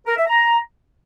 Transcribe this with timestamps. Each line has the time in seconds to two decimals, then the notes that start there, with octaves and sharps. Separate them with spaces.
0.06 A#4
0.17 E5
0.27 A#5